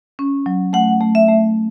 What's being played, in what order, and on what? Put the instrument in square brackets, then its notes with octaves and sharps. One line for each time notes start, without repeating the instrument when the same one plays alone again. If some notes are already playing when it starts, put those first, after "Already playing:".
[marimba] C#4
F#3
[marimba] A3 [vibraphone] F#5
[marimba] A3
[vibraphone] E5
[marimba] A3